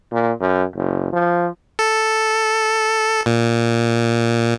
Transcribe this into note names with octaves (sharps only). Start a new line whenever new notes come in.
A#2
F#2
F#1
F3
A4
A#2